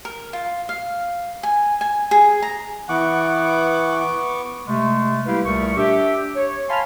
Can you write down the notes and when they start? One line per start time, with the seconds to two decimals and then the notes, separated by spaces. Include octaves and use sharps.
0.05 A#4
0.33 F4
0.69 F5
1.43 G#5
1.81 G#5
2.11 G#4
2.42 A#5
2.89 E3 B3 F#5 C#6 D6
4.67 C3 G#3 A3
5.26 G3 A#3 E4 G4 B4 F5
5.44 C2 A#2 A3 A#4 C#6
5.77 D4 G4 E5
6.36 C#5
6.69 F5 G#5 A5 B5 C6 F6